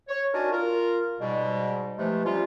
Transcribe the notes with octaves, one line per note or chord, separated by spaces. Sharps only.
C#5
D4 D#4 F#4 A#4 G#5 A5
F4 A#4
G#2 B2 G3
C3 E3 F3 G#3 A3
C3 F3 G3 C#4 F4